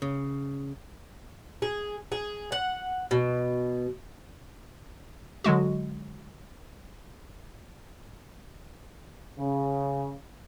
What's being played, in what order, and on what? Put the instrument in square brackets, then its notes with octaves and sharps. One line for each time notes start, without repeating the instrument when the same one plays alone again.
[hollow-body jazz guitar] C#3
[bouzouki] G#4
G#4
F#5
B2
[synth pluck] D3 F#3 G#3 F#4
[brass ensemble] C#3